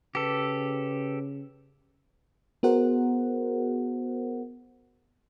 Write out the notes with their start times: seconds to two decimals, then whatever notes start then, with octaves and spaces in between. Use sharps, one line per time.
0.15 C#3 G4 A4 B4
2.63 B3 F#4 G#4 A#4 C5 F#5